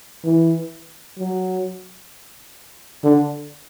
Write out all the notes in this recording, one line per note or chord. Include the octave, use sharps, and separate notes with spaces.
E3
F#3
D3